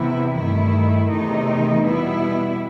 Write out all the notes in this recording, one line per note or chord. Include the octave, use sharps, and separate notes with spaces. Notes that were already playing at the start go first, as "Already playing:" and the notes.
Already playing: E2 C3 E3 B3 E4
G2 D#3 A3 E4
E2 C3 D#3 A3 D#4
B2 G3 B3 E4